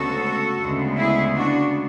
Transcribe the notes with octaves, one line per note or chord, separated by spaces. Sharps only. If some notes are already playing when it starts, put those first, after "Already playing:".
Already playing: D2 C#3 G#3 B3 F#4 A4
D2 C#3 G#3 B3
E4 G#4
D4 F#4